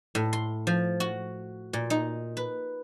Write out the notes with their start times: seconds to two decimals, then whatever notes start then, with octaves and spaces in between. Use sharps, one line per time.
0.15 A2
0.33 C6
0.67 F3
1.00 F#4
1.73 A#2
1.90 D#4
2.37 B4